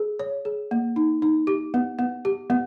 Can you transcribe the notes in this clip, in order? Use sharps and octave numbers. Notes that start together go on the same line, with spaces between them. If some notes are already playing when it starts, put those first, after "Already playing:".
Already playing: G#4
C#5
G#4
A#3
D#4
D#4
G4
B3
B3
G4
B3